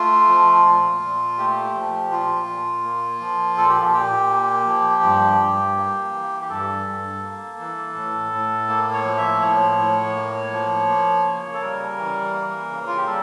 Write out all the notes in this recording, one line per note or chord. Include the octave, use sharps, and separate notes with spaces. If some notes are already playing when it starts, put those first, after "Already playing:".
Already playing: A3 F4
F3
A#2
A#2
A3 G4
F3
A#2 F4
A#2
A#3
F3
A#2 A4
G4
F4
A#2 G4
A#3
F3
G2
G2
A#3
E3
G4
G2 A4
G2
A#3
E3
A2
A2
A#3
C#5
F3
E5
A2 C#5
A2
A#3
F3
A#3
C#3
A4
G3 A#4
E3
A#3
C#3
F4
G4
G3 A4